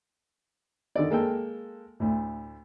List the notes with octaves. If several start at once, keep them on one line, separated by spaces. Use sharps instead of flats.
D3 D#3 A4 D5
G#3 A#3 A4 G5
D2 A2